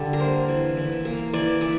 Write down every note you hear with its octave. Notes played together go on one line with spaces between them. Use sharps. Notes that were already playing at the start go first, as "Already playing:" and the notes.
Already playing: D3 G3
A#4
A#3 C5
E3
E3
A#3
E3 D5
E3